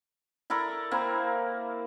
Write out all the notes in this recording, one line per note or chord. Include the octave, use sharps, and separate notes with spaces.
E4 A4 A#4 D5
A#3 C4 E4